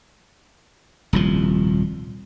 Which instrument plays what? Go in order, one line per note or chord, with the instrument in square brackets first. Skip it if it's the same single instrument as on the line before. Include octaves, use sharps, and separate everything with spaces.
[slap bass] D#1 C2 F3